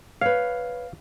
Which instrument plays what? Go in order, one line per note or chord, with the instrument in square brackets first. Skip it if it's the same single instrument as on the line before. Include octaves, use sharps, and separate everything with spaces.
[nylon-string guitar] B4 C#5 [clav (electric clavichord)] F5